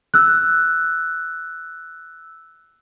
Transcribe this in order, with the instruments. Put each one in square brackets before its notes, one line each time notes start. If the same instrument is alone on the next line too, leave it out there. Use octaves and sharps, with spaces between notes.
[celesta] E6 F#6